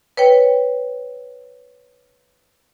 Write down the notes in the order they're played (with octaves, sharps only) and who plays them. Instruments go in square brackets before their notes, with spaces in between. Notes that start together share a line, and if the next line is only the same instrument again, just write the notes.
[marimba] B4 C#5 G5